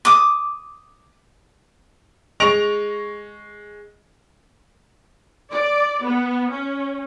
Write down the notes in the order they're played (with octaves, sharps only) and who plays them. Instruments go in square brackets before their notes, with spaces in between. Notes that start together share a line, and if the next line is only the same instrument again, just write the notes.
[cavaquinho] D6 D#6
[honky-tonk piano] G#3 C#6 A#6 D7 F7
[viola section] D5
B3
C#4